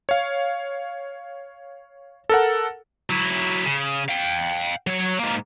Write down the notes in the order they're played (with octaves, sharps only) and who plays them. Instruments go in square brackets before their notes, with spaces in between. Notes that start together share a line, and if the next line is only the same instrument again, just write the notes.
[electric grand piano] C#5 F5
A4 A#4 F#5
[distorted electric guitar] F#3 E4
C#3
F5 G5
F#3 C#5
G#2 A#3